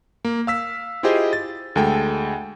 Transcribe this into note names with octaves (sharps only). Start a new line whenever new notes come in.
A#3
F5 E6 B6
E4 F4 G4 G#4 C5 D#5
A6
D2 G#3 A4 G5